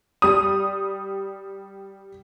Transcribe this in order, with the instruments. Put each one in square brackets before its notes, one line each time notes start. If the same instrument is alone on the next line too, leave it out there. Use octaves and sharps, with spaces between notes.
[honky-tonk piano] G3 D#6